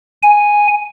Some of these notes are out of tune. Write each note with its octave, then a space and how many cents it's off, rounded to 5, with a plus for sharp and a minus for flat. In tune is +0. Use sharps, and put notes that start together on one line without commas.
G#5 -5